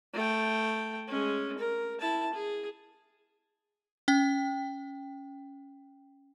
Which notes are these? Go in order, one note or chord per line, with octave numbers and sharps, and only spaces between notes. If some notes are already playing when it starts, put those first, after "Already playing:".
A3 G5
G#3 C#4
A#4
E4 A5
G#4
C#4 G5